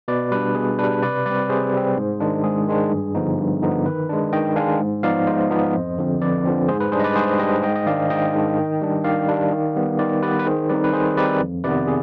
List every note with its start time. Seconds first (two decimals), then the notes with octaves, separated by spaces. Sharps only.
0.08 B2 B4 D5
0.32 G3 D4 B4
0.55 B2 G#4
0.79 G3 D4 B4
1.02 C3 B4 D5
1.26 G3 C4 B4 D5
1.49 C3 G#4 C5
1.73 G3 C4
1.96 G#2
2.20 D#3 G#3 D4
2.44 G#2 G#4
2.68 D#3 G#3 D4
2.91 G2
3.15 D3 F3 B3 D#4
3.38 G2
3.62 D3 F3 B3 D#4
3.86 D#3 B4
4.09 G#3 D4
4.33 D#3 D#5 G5
4.56 G#3 D4 F5 G#5
4.80 G#2
5.03 F3 B3 D#4 D5 F5
5.27 G#2 C5 D#5
5.50 F3 B3 D#4
5.74 F2
5.98 D3 F3 C4
6.21 F2 B4 D5
6.45 D3 F3 C4
6.68 G#2 G#4 C5
6.80 B4
6.92 G3 D4 G#4 C5
7.00 D#5
7.04 B4 D5
7.16 G#2 G#4 C5
7.39 G3 D4 D#5 G5
7.63 G#2 D#5 G5
7.76 D#5
7.86 D#3 G#3 D4 D5 F5
8.10 G#2 D#5 G5
8.34 D#3 G#3 D4
8.58 D#3
8.81 G3 D4
9.04 D#3 D5 F5
9.28 G3 D4
9.52 D#3
9.76 G3 B3
9.99 D#3 B4 D5
10.23 G3 B3 B4 D5
10.39 B4
10.46 D#3 G#4 C5
10.69 G3 C4 D#4 B4 D5
10.84 B4
10.93 D#3 G#4 C5
11.17 G3 C4 D#4 B4 D5
11.40 F2
11.64 C3 D#3 B3 B4 D5
11.88 G#4